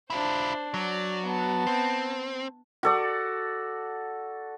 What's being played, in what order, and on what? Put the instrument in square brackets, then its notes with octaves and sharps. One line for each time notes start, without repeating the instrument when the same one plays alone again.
[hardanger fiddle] D4 C5 [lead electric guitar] E4 F4
[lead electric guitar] F#3 [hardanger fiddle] D5
[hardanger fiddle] B3 A5
[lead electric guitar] C4
[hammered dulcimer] F#4 A4 D5